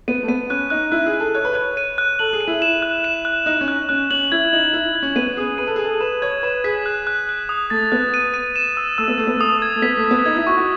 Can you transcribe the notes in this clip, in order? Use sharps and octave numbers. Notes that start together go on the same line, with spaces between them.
B3 D#7
A3
B3 D#7
C#4 F#6
D#4 F#6
E4 F#6
G#4
F#6
A4
C#5 F#6
B4
C#5 F#6
D#7
F#6
A4 F#7
G#4
D#7
E4
E7
F#6
E7
F#6
D#4 F#6
D#4
C#4
F#6
C#4 F#6
C#4 F#7
E4 G#6
D#4 F#7
E4 F#7
G#6
C#4
B3 D#7
G#4 D#6
B4 D#7
A4
G#4 D#7
A4
B4 E7
C#5 G#6
B4 E7
G#4 B6
F#6
F#6
F#6
D#6
A3 A6
B3 F#6
D#7
D#7
E7
E6
A3 E6
B3
A3 E6
B3
A3 D#6
G#6
A3
B3 B6
A3
B6
B3
D#4 G#6
E4
F#4 C#6
F#4